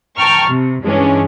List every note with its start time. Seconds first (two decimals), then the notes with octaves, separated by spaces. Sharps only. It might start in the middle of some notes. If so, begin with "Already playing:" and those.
0.17 G5 A5 A#5 C#6 F6
0.49 C3
0.83 G2 E3 G#3 C#4 D4